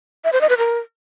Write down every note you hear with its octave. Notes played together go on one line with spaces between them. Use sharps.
E5
C5
D#5
B4
A#4